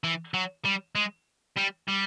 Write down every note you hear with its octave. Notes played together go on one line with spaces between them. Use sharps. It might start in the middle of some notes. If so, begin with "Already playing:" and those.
E3
F#3
G3
G#3
G3
G3